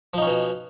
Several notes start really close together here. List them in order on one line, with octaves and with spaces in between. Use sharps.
F3 D#4 C#4 B2